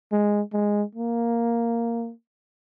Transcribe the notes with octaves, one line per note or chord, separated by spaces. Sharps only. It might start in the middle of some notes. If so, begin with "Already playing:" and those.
G#3
G#3
A#3